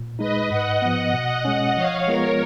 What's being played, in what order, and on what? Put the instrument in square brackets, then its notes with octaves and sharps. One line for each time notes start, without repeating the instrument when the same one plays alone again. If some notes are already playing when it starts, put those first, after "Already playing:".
Already playing: [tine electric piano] A#2
[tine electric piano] G#3 D#4 [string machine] B4 D#5
[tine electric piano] G#2 [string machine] D#5 F#5
[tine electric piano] F3 B3
B2
G#3 C#4
[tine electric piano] F3 [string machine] C#5 F5
[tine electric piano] G#3 B3 F4 [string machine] A#4 C#5